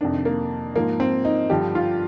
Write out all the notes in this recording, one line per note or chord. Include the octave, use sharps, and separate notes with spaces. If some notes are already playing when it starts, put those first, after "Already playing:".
F2 C3 D#3 D4
A#3
G#2 F3 A#3
C4
D#4
G2 D3 F3 G4
F4